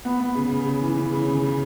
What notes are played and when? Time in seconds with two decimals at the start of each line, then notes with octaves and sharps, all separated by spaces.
0.05 B3
0.20 B3
0.35 C#3
0.51 C#3
0.66 C#3
0.81 E3
0.97 C#3
1.13 C#3
1.28 C#3
1.43 C#3